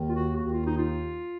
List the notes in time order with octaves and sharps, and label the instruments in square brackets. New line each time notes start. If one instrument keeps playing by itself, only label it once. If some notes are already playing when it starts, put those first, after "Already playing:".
Already playing: [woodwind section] D#2 D#3 A#3
F4
F#4
D#2 D#3 A#3 F#4
F4
D#4
F4